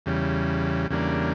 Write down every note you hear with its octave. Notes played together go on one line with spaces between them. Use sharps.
E2 C#3 G3
E2 C#3 G3 A#3 D4